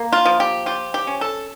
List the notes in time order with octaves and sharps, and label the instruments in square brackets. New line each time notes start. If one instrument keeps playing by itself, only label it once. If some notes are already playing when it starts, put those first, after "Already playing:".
Already playing: [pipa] A#3
F4
F3
G4
F4 G4
G4
C#4
A4